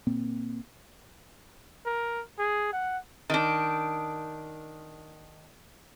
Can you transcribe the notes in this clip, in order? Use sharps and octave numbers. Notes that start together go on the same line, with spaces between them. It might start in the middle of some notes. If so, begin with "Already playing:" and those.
A#2 A#3 C4
A#4
G#4
F#5
D#3 D4